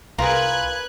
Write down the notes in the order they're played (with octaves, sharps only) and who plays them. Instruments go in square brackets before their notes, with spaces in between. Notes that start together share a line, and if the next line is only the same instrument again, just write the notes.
[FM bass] C2 [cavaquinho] F4 G#4 [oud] A#4 [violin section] B4 F#6 G#6